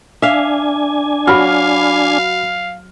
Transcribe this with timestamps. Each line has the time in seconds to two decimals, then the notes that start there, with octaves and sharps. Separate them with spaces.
0.22 D4 E5 F5 G#5
1.27 F#3 F#4 F5 B5 F6